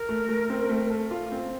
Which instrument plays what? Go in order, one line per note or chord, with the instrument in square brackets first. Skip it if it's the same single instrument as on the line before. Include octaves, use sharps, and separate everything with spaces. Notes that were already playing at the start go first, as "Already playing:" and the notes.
Already playing: [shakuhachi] A#4
[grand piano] A3
A3
C4
A3
A4
F4
C4